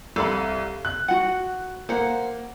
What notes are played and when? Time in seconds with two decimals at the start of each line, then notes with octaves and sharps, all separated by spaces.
0.16 C2 A4 F5 B5
0.85 F#6
1.08 F#4 F#5
1.89 A#3 C5 F#5